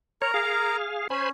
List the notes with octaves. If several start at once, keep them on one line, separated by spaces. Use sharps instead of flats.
A#4 C#5 A#5
G#4 F5
C#4 C5 G#5 B5